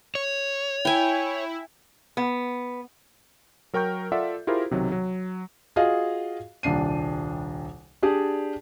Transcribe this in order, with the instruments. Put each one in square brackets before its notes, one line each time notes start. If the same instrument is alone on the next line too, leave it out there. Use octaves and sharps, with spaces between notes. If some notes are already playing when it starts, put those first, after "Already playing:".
[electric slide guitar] C#5
[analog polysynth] E4 [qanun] G5 G#5
[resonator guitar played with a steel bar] B3
[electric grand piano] F#3 A#4 G5 C#6 G6
F4 A4 D5 E5 F#5
E4 F4 G4 G#4 A#4 C5
B1 C3 D#3 F#3
F#3
[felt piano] F4 F#4 G#4 D#5 F5
D#1 C2 D4 C7 D#7
D4 G4 G#4 D5